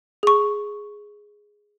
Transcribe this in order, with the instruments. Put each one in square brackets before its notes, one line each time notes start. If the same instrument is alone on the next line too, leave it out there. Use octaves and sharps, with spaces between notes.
[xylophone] G#4 C#6